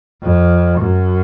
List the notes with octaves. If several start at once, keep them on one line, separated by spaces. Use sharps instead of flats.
F2
F#2